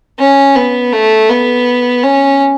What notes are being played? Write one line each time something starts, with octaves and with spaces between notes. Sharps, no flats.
C#4
B3
A3
B3
C#4